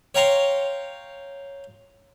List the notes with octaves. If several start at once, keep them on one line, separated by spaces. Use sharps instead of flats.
C#5 F5 G5 A#5 C6 C#6